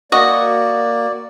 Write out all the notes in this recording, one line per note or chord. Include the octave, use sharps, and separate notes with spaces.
A#3 F#4 D5 D#5